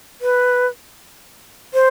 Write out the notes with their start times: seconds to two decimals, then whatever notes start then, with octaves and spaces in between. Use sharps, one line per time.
0.21 B4
1.74 C5